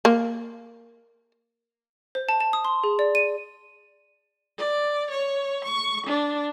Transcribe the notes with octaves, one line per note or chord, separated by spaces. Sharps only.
A#3
C5
A5
A5
D#6
C6
G#4
D5
D#7
D5
C#5
C#6
D4